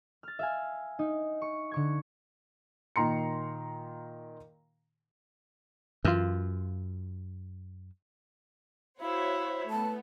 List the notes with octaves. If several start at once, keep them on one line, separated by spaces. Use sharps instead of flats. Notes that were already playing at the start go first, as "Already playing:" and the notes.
F6 A6
E5 F5 G#5
D#4
C#6
D3 C#6 G#6
A#2 D#3 A#5 C6 C#7
F#2 E3 F4
E4 F#4 C5 C#5 E5 F5
A3 B3 A5